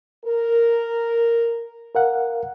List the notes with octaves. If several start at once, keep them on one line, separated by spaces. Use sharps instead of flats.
A#4
A#4 F5 F#5